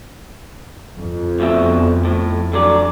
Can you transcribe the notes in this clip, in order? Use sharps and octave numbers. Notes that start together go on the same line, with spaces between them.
F2
D2 B2 E5
A2
D3 F#3 D5